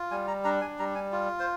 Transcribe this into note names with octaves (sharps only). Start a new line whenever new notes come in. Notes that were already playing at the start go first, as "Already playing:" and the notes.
Already playing: F4
G3 G#5
A#5
D4 A#5
G#5
G3 A#5
G#5
F4
C5